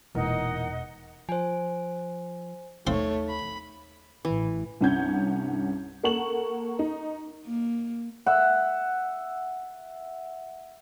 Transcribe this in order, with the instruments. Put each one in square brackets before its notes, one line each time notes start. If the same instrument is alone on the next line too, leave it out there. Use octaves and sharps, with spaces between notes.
[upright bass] E1 [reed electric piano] A#2 E3 A#4 [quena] D#4 [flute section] D#5 F#5
[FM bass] F3 [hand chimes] C5 G#5
[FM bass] D#2 [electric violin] A3 C#5 [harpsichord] C4 C5 F5 [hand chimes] D#4
[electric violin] B5
[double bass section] A1 [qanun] E3
[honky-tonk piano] C2 G2 C#4 F#5 G6 G#6
A#3 A4 F#5 C#6 E7 F#7
D#4
[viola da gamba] A#3
[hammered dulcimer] E5 F#5